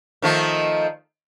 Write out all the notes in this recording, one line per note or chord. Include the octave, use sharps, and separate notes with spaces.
D#3 F3 A3